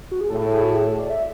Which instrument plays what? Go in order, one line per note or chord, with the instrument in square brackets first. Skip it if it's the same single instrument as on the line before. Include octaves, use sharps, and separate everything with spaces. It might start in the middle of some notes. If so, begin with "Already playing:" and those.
[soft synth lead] F#4
G#4
[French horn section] A2 [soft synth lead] A4
[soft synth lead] G#4
F#4
G#4
A4
D5
E5